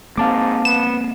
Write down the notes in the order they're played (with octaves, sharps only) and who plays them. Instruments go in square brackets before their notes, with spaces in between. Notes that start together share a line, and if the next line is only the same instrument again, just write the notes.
[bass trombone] G#2 [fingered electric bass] A#3 C4 [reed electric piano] F5 A5 D6
[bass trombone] B3 [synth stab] E7